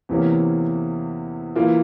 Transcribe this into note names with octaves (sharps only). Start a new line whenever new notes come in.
E2 C3 E3 A#3 C#4
E3 A#3 F4